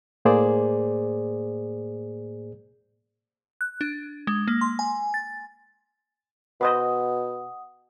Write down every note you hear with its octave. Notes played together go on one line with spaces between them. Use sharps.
A2 A#3 G#4 C5 D5
F#6
D4
G#3
A#3
C6
G#5
A6
B2 B4 C5 D#5 F#5 D#6